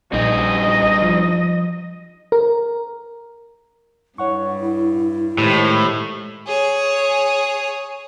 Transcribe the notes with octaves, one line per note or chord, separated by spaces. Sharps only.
A#1 G2 D#4 D#5
F3
A#4
G2 E4 C#5 F#5 C#6
A2 D#3 G#3 G4 C5 B5
G#4 C#5